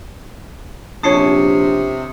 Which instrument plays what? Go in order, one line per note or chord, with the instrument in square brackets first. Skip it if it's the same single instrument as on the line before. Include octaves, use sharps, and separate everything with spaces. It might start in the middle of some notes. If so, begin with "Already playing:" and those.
[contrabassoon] A#1 [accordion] C3 [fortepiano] C#4 A5 [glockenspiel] D#6 C7 C#7